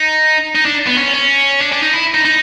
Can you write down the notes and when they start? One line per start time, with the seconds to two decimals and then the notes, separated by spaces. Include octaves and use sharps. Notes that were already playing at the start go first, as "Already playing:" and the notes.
Already playing: D#4
0.55 D#4
0.65 D4
0.87 B3
0.97 C#4
1.14 C#4
1.61 D4
1.72 D4
1.82 D#4
1.93 E4
2.14 D#4
2.25 D#4